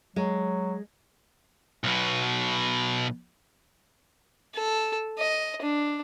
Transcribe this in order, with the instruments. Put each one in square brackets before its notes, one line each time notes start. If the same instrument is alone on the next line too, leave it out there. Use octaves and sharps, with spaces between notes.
[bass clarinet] F#3 [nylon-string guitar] G#3
[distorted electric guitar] B1 B2
[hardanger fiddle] A4
D#5
D4